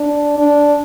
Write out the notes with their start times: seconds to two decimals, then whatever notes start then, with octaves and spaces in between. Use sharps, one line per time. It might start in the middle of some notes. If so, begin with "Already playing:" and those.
Already playing: D4
0.38 D4